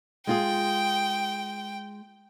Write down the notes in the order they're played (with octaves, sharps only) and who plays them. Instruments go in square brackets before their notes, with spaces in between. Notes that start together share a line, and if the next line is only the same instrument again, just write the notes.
[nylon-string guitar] G#3 F4 G#4 [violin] G5